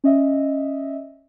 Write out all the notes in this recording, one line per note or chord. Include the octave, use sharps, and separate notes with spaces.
C#4 D#5 E5